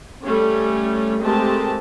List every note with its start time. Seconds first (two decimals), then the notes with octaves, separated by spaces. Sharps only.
0.24 G3 A3 C#4
1.21 G#3 A3 C4 G4 A#4 A5